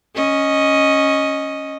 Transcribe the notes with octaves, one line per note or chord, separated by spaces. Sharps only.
C#4 D#5